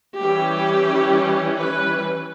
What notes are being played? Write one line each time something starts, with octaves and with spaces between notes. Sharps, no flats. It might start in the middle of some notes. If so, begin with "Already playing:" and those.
E3 G3 C#4 G4
B4